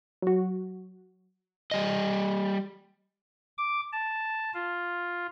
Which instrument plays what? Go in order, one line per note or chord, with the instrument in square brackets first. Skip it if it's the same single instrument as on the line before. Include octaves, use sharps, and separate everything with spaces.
[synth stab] F#3 F#4
[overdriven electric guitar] G3 D#5
[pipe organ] D6
A5
F4